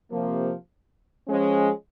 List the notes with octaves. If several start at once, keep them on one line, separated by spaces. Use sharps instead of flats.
C3 F3 A#3
F3 G#3 C#4